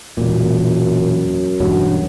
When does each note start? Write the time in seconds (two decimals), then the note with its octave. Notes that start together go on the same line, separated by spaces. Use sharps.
0.17 E1 F#2 A#2
1.60 E1 G2 F#3